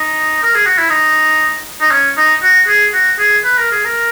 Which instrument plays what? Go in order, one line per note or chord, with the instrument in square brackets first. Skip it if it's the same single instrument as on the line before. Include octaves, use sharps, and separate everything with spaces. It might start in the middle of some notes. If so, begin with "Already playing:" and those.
Already playing: [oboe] D#4
A#4
G#4
F#4
E4
D#4
D#4
C#4
D#4
F#4
G#4
F#4
G#4
B4
A#4
G#4
A#4